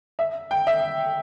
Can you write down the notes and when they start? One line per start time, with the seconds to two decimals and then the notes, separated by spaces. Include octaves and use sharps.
0.19 E5
0.51 G5
0.67 E5